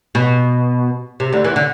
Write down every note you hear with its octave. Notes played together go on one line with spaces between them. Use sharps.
B2
C3
D2 D3
E2 E3
D3